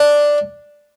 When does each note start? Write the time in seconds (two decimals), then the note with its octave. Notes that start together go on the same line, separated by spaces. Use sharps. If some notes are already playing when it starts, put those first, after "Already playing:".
Already playing: D4